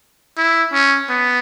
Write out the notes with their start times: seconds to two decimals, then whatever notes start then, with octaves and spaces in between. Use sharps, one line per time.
0.37 E4
0.73 C#4
1.09 B3